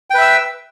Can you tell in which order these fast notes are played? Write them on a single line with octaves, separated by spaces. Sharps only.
G5 B4 E5 E6